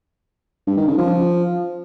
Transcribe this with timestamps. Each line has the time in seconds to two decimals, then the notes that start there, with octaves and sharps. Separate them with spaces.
0.67 G2
0.77 D#3
0.88 C#3
0.98 F3